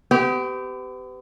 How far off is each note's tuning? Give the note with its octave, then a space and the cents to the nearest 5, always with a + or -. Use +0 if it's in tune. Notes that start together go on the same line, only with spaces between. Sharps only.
B3 +40 G4 -15